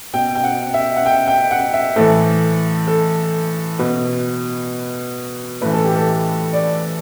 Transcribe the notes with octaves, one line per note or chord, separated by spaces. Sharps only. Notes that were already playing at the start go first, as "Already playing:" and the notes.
B2 G5
G5
F#5
E5
F#5
G5
G5
F#5
E5
A2 E3 A4
A4
B2 B4
A2 E3 B4
A4
G4
A4
D5